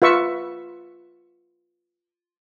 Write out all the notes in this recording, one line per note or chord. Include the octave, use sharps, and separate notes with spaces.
F4 B4 E5 C#6